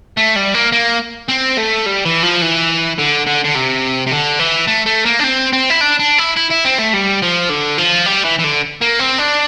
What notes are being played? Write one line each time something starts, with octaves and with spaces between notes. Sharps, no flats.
A3
G3
A#3
A#3
C4
A3
G3
E3
F3
E3
D3
D3
D3
C3
C3
D3
E3
A3
A3
A#3
D4
C4
C4
E4
D4
D4
E4
E4
E4
C4
A3
G3
F3
D3
F3
G3
E3
E3
D3
A#3
C4
D4